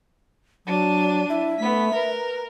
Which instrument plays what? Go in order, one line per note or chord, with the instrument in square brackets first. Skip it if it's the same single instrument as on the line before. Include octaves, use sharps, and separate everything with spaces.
[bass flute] F#3 [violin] D4 D#7
[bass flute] E4 [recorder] E5
[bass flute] A3 [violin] B3 B6
[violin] A#4 [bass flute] B4